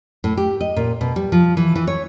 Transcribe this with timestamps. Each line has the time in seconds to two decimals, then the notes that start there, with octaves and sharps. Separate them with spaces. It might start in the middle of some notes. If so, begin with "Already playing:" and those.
0.24 A2
0.37 G4
0.60 D#5
0.76 A#2
1.01 B2
1.16 G3
1.32 F3
1.57 E3
1.75 E3
1.87 C#5